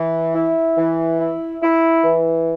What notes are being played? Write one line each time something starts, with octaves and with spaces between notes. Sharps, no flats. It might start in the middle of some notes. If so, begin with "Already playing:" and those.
Already playing: E3
E4
E3
E4
E4
E3